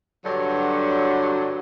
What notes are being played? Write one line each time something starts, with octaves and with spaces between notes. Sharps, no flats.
G2 D3 F#3